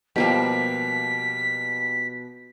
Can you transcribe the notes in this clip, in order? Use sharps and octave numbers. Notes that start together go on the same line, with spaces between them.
B2 F3 G3 A#3 G4 B6